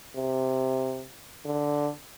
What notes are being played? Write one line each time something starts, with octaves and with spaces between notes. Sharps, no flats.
C3
D3